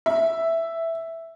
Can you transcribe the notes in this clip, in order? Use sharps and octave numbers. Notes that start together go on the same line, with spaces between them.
E5